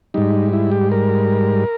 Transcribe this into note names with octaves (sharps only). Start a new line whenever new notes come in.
G#2 G3 D#4
E4
G4
A#4